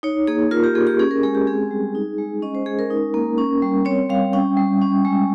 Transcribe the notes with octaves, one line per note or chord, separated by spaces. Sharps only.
D#4 C#5
A#3 G#4
F4 A#4
G4
A#3 G#4
G4
C#4 G#4
A#4
G#3 G#4
G4
C4 G#4
G3
D#4
G#3
C#4 D#5
C5
G#3 G#4
A#4
D#4
A#3
C#4
G3
C4 C#5
G3 F5
C#4 G5
G3
C#4
G#3